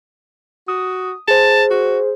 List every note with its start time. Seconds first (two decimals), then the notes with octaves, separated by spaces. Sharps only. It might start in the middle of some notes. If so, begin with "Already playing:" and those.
0.68 F#4 D#6
1.28 G#4 C5 A5
1.71 F#4